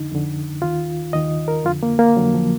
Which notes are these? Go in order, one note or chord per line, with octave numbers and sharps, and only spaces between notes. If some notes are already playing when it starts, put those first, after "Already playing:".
Already playing: F2 D3 D#4
F2 D3
D#2 D#3 F4
D#2 D#3 D#5
A#4
F2 D3 F4
A#3
A#3
F2 D3 F#3
F3